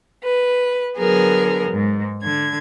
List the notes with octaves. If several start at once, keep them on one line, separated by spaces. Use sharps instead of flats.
B4
D3 F#3 B3 G#4 A#4
G#2
D3 G#6